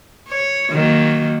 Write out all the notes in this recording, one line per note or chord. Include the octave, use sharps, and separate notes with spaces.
C#5
D#3 F#3 A#3